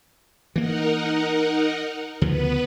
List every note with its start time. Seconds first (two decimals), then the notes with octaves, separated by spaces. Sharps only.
0.56 E3 A#3 D#4 A#4 F#5
2.22 D2 C#3 F3 B3 B4